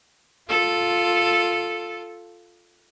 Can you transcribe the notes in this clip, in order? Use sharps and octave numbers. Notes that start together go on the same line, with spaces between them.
F4 A4